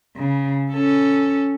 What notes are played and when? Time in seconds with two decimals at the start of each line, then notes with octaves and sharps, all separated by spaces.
0.16 C#3
0.72 C#4 A4